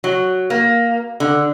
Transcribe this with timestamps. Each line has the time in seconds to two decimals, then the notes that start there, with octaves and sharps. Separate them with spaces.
0.04 F#3
0.50 A#3
1.20 D3